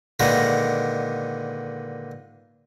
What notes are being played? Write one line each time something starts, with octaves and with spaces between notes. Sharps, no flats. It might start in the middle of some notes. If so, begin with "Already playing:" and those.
A#2 D3 D#3 G#3 B3 A#4